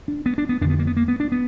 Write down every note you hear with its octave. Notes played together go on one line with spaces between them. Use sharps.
D4
B3
D4
B3
F2 D3 D4
B3
A#3
B3
A#3
B3
D4
B3